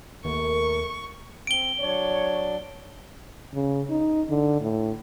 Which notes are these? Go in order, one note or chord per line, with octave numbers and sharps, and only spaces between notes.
D#2 A3 A#4 C#6
C4 D7 G7
F#3 D4 C#5 D5
C#3
D#4
D3
A2